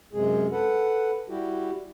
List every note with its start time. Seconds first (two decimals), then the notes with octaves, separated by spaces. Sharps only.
0.13 F#2 C3 G#3 G#4
0.52 A4 B4 F#5
1.29 G3 E4 F#4 G4